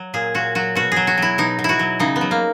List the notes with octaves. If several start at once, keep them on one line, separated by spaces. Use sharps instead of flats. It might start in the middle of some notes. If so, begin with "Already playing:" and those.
Already playing: F#3
A#2 G#4
A#2 F#4
F#3 F#4
B2 F#4
F#3 G#4
F#4
F#3 E4
B2 D#4
B2
E4 F#4
F#3
C#3 D#4
B3
F#3
A#3